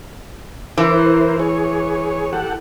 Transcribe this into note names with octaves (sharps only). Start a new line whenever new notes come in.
E3 E4 A#4 C5
G#4 C#5
G4 A4 F#5